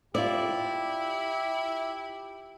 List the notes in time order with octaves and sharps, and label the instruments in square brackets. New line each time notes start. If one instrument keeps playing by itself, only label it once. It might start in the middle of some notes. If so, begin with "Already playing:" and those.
[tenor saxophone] E4 [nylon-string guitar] F4 D5 [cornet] G4